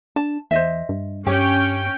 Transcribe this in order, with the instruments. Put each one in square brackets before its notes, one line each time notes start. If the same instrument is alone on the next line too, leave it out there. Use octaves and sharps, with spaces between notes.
[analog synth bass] D4 [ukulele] A5
[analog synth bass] E2 [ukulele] C5 D#5 E5
[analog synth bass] G2
[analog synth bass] G2 [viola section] C#4 G5 [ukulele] G4 C#5